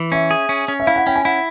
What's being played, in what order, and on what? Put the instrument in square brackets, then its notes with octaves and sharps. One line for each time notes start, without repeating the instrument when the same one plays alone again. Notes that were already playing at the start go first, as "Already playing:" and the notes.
Already playing: [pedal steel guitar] E3
[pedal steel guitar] C#4 [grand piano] E5
[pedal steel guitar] G#4
C#4
C#4
[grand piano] E5
[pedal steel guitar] E4 [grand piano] F5
[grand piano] F#5
[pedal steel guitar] C#4 [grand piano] G5
[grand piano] G#5
[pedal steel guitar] E4 [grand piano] F#5